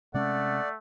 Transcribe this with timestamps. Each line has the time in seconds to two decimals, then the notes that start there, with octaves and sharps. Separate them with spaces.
0.14 C3 G#3 A3 C#4 D5 F#5